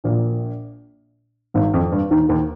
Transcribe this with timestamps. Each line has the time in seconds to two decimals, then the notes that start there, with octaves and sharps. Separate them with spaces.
0.04 A#1 A#2
1.54 G#1 G#2
1.74 F2
1.92 G2
2.11 D#2 D#3
2.29 D#2 D#3